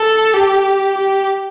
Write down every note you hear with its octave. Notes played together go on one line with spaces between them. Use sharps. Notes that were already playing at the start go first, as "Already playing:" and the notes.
Already playing: A4
G4
G4